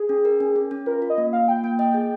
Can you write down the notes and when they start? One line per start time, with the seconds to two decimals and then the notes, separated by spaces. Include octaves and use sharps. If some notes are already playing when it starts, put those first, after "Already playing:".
Already playing: G#4
0.09 C#4
0.25 A#4
0.40 C#4
0.56 C#4
0.71 C#4
0.86 F4 A#4
1.02 F4
1.10 D#5
1.18 A#3
1.33 A#3 F5
1.48 F4 G5
1.64 A#3 G5
1.79 D#5 G5
1.94 G#4